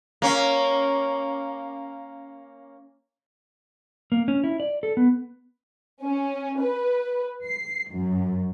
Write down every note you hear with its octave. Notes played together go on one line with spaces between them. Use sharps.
A#3 C#4
A#3
C#4
E4
D5
A4
B3
C#4
B4
C7
F#2